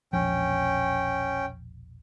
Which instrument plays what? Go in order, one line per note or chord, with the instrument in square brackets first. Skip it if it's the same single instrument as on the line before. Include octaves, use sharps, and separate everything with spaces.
[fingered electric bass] E1 A#1 F3 [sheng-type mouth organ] C#4 G5